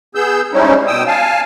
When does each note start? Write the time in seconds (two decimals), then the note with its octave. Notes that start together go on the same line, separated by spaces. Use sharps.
0.15 B3 G#4 E6 G6
0.53 G3 G#3 C4 C#4 D#4 E4
0.87 B2 G5 D#6 E6
1.07 F5 G#5 A5